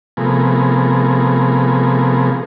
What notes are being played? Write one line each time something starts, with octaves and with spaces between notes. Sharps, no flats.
C3 F3 A3 B3 G#4 A#4